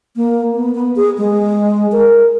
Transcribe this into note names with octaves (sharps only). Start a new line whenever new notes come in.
A#3
B3
B3
G#4
G#3
A#4